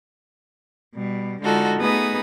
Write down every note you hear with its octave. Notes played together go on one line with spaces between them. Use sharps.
B2 G3
D3 G#3 D#4 F4 F#4 A4
A3 B3 D#4 G#4 B4 D#6